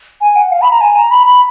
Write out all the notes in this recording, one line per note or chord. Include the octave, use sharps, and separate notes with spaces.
G#5
F#5
F5
B5
A#5
G#5
A#5
B5
B5